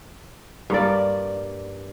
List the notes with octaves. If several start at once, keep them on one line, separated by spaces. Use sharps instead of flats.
G2 A#3 D5